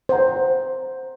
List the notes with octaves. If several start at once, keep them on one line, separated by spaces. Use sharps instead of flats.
C5 F#5 A#5